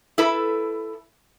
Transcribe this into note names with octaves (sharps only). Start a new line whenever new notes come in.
E4 A4 B4